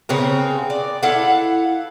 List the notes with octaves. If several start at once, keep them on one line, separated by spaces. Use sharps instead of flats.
C#3 B3 C4 A#4
D5
E4 A4 F5 F#5